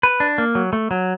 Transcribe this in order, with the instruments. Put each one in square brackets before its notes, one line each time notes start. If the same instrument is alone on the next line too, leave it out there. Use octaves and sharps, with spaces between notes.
[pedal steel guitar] B4
D4
A#3
F#3
A3
F#3